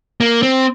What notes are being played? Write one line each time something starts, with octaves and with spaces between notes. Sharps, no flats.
A#3
C4